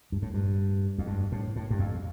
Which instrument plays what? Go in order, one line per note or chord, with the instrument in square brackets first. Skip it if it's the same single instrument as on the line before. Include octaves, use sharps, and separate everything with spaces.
[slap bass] G2
A2
G2
F2
G2
A2
A2
G2
F2